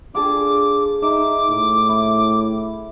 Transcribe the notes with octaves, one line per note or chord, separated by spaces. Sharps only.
D4 F4 G#4 A4 D6
D#4 E5 D6
A2
E4